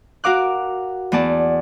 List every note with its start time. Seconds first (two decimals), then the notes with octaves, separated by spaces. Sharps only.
0.24 F#4 A#4 F5 D6 F#6
1.12 E2 B3 D5 A5